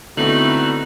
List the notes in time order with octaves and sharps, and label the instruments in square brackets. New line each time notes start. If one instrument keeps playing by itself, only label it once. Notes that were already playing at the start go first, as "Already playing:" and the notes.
[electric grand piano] D3 B3 C4 [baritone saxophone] A3 [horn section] D#4 E4 F#4 [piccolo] F#7